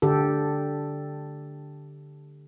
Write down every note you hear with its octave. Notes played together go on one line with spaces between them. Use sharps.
D3 G4 A4